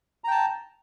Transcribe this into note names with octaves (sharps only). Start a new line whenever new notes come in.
G5 A5 A#5